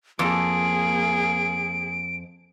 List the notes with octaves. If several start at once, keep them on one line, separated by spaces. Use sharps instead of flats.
F2 A#3 G#4 D7